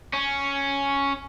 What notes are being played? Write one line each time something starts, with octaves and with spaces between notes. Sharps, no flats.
C#4